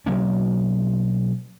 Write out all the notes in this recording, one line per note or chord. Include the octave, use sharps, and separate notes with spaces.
B2 F#3 A#3 C#4